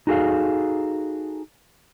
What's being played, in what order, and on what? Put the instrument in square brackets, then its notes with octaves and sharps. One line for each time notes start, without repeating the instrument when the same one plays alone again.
[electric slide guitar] D#4 F#4 G#4 A4 F5